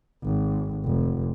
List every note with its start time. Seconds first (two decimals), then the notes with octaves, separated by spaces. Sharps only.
0.23 G#1
0.85 F1